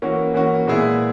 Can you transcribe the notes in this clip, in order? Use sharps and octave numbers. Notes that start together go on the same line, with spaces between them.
E3 A#3 C#4 F#4
E3 A#3 C#4 F#4
A#2 G#3 B3 E4 G#4